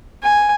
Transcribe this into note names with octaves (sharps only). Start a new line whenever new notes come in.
G#5